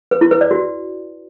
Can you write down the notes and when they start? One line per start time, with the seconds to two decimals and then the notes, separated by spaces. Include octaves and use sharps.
0.11 B4
0.21 E4
0.31 B4
0.41 D5
0.51 F#4